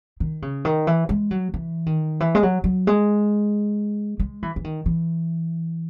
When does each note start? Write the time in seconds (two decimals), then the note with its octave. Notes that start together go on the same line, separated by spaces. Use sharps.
0.20 D#3
0.42 C#3
0.65 D#3
0.87 E3
1.09 G#3
1.31 F#3
1.54 E3
1.86 D#3
2.20 E3
2.35 G#3
2.43 F#3
2.64 F#3
2.87 G#3
4.20 G#3
4.43 E3
4.56 E3
4.64 D#3
4.86 E3